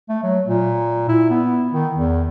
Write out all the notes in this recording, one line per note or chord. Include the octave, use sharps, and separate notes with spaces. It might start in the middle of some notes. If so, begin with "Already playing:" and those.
A3
F#3
A#2
E4
B3
D#3
E2